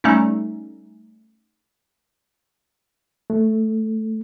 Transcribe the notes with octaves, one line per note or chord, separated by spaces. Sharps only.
G3 A3 C#4 D#4
A3